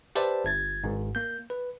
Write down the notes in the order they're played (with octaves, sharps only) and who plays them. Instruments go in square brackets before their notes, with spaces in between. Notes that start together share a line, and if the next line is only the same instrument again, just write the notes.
[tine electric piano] G4 B4 C5 D5 E5 A5
G1 G#6 A6
G#1 G#2
A#3 G6
B4